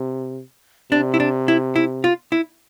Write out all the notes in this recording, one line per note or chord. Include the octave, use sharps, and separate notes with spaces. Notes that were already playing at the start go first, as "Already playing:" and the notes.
Already playing: C3
C3 D4
E4
D4
E4
E4
F4
E4